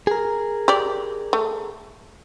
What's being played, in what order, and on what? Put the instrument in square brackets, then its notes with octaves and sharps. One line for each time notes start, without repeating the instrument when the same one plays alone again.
[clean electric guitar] G#4 A#4
[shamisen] G4 D5
A3